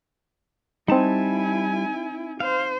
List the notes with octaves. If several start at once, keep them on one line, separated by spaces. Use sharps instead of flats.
G3 C4 D#4 E4 G#5 A5
C5 F5